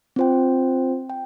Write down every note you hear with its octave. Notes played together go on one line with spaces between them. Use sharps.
C4 F4 C5 G5
G5